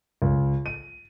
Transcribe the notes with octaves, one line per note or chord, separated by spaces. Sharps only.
C#2
D#7